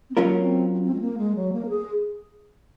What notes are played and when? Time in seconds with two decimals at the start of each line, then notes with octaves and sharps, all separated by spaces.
0.10 C4
0.16 F#3 A#3 C#4 F4 A#4
0.42 C4
0.84 C4
0.94 G#3
1.01 A#3
1.18 G#3
1.35 F#3
1.53 A#3
1.65 A#4
1.69 G#4